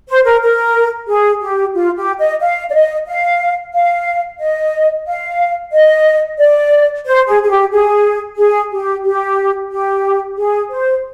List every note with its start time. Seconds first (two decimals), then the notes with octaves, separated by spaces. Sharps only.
0.08 C5
0.25 A#4
0.42 A#4
1.08 G#4
1.42 G4
1.74 F4
1.97 G4
2.19 D#5
2.41 F5
2.70 D5
2.74 D#5
3.07 F5
3.73 F5
4.40 D#5
5.07 F5
5.73 D#5
6.39 D5
7.06 C5
7.27 G#4
7.43 G#4
7.50 G4
7.72 G#4
8.38 G#4
8.71 G4
9.04 G4
9.71 G4
10.37 G#4
10.71 C5